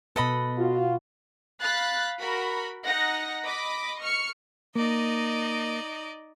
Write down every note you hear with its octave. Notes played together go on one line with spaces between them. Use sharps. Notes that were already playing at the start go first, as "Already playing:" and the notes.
B2 A4 B4 D#5 B5
F4 F#4
F5 B5 F#6 A6
F#4 A#4 B5
D#4 F#5 A#6
D#5 B5 D6
C#6 F6 C#7
A#3 D#4 D5 D#5